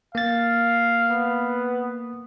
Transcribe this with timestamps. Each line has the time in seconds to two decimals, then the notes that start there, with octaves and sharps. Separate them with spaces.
0.15 A#3 F5 A6
1.10 B3